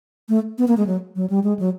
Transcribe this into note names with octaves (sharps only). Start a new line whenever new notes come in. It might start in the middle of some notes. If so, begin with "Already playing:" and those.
A3
B3
A#3
G#3
F#3
F#3
G3
G#3
F#3